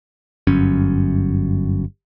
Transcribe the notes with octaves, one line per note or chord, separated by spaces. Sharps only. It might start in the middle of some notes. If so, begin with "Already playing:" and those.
G1 F#2 C#4